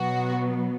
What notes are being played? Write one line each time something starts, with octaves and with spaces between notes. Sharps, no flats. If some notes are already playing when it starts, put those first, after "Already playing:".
Already playing: B2 F#3 B3 F#4